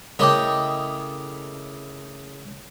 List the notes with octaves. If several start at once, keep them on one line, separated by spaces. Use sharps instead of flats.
C#3 A3 E4 A#4 D#5 G5 D6